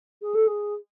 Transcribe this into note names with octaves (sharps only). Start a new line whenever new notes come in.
G#4
A4
G#4